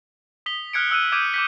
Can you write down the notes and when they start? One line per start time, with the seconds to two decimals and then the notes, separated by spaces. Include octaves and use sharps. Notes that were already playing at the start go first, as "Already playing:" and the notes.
0.46 D#6 B6 G7
0.73 F6 F#6 G#6 C#7 D7
0.91 E6 F#6 D#7
1.12 D6 D#6 G6 G#6 D7 D#7
1.34 D6 G6 B6